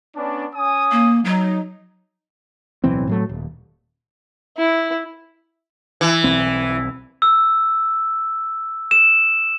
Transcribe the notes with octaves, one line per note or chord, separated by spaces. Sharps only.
B3 C#4 D4
C#4 G#5 D#6
A#3
F#3 D#4
D1 B1 E3 C4
A2 F#3 A3
D#1
E4
E3
B1 C4
E6
E7